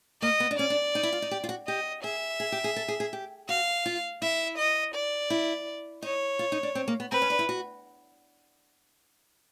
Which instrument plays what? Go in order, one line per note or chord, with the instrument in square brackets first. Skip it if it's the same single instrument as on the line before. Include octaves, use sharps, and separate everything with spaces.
[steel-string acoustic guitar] A#3 [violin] D#5
[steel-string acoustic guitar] B3
D4
[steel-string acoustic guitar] C#4 [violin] D5
[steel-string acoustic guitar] D4
D#4
E4
F4
D#4
G4
F4
F#4
[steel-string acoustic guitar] G4 [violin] D#5
[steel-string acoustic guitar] G#4 [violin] E5
[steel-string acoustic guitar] G#4
G4
G#4
A4
G#4
G#4
G4
[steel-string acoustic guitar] F#4 [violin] F5
[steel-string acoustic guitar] F4
[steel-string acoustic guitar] E4 [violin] E5
[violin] D#5
D5
[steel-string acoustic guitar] E4
[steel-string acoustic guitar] D#4 [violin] C#5
[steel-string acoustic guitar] F4
D#4
D4
C4
A#3
B3
[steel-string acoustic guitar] C4 [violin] B4
[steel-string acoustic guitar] C#4
D4
E4
F#4